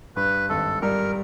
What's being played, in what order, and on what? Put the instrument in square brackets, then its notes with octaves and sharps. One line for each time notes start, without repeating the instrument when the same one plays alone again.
[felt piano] G2 [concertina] B4
[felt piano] G#1 [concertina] A4
[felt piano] G3 [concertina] A#4